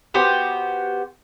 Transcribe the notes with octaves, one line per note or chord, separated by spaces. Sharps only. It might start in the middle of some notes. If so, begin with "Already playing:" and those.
B3 F#4 G4 C5